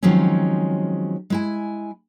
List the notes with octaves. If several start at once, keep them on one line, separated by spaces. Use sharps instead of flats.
D#3 F3 F#3 G#3 C4 C#4
G#3 E4 G#5